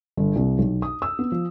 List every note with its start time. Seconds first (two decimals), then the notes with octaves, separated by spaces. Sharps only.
0.17 G1
0.36 C2
0.59 B1
0.82 D#6
1.02 E6
1.19 B3
1.32 F3